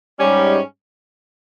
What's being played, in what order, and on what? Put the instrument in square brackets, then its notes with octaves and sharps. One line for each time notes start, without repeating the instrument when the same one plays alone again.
[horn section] G#2 G3 C#4